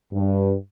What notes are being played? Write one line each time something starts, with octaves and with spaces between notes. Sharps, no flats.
G2